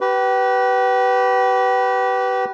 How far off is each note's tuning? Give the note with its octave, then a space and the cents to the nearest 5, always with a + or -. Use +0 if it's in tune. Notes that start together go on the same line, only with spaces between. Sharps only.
G4 -35 B4 +0